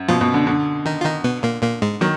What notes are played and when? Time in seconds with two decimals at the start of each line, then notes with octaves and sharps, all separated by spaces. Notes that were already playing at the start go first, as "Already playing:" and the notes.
Already playing: F#2
0.08 B2 F3 F4
0.21 B2
0.34 D3
0.47 D3
0.86 D#3 D#4
1.00 F4
1.05 D#3 D#4
1.24 B2 B3
1.43 A#2 A#3
1.62 A#2 A#3
1.82 G#2 G#3
2.01 D#3 F#3